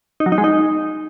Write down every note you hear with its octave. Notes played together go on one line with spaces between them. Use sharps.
D#4
F#3
D#4
G#3
D#4